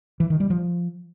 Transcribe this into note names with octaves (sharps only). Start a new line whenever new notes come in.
E3
D#3
G3
F3